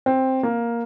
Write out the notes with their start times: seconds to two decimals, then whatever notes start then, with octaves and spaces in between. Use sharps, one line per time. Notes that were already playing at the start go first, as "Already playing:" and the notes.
0.06 C4
0.43 A#3